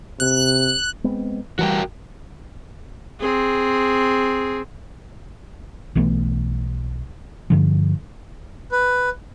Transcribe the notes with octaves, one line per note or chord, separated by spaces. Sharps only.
C3 F#6
G#3 B3 C4
E3 G3 F#4 A#4 G5
C4 G#4
B1 E3 A3 B3
G2 D3 F3
B4